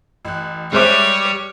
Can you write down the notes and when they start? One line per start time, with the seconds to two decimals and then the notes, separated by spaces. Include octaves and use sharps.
0.25 A1 F#6
0.73 G3 G#3 C5 C#5 E5 D6 F6 F#6